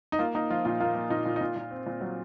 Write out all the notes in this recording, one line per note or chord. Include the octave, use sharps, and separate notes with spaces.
D#4
A#3 F4
A#3 D#4
F3 F4
A#2 F4
A#3 F4
A#3
A#2 D#4
A#2
D#4
A#2 F4
A#2
C4
A#2
F#3